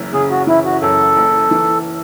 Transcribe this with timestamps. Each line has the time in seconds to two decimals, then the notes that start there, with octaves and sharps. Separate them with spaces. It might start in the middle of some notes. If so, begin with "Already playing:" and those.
Already playing: F#1 F#2 C#3 E3
0.13 C#3 G#4
0.30 F#4
0.47 E3 E4
0.65 F#4
0.82 F#2 A4
1.17 F#1
1.51 E3